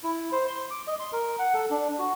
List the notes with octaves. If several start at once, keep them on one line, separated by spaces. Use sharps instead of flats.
E4
C5
C6
D6
D#5
C6
A#4
F#5
A4
D4
F#4